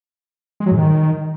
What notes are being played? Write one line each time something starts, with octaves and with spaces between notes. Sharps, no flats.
G#3
F#3
G#2
D#3